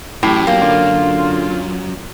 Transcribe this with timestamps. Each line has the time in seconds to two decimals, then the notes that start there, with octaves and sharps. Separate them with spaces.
0.23 A1 F#2 A2 G4
0.47 B1 A#3
0.62 D3 F4